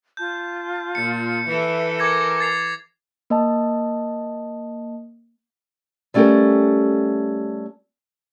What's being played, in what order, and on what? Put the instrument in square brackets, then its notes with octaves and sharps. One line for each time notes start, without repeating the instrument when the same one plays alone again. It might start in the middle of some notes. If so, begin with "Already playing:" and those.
[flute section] F4 A5 [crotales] G6
[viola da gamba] A#2 [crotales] C#7
[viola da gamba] E3 A4 [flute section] B4 E5
[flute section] A#4 G#5 [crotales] D6 G#6 A#6
[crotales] A6 C7 F7
[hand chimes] A#3 D#5 A5
[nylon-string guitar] G3 A3 C#4 G4 A4 A#4